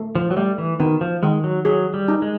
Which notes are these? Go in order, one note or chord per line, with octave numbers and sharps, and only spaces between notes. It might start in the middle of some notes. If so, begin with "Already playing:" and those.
Already playing: A3
F3
F#3
G3 A3
E3
D#3 B3
F3
D#3 G#3
F#3
F#3 G#4
G3
D#4
G#3